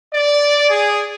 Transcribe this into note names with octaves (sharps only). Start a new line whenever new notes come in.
D5
G#4